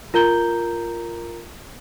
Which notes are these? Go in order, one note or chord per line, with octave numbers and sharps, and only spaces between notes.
F4 A#4 A#5 G6 G7